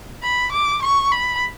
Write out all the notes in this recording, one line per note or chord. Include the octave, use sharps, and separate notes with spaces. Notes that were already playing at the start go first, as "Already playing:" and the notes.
B5
D6
C#6
B5